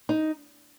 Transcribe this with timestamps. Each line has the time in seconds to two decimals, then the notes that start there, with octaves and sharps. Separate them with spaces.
0.09 D#4